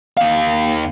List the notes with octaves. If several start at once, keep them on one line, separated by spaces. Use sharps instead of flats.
D#2 F5